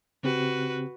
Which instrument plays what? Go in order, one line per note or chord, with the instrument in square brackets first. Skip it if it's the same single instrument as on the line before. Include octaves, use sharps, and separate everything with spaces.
[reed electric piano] C#3 C4 G4 [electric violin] F#4 B4